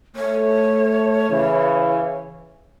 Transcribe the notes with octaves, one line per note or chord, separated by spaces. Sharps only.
A3 C#5
C#3 E3